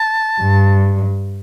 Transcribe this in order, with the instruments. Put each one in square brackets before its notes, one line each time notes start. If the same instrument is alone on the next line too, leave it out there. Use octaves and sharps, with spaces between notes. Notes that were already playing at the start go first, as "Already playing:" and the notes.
Already playing: [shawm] A5
[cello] G2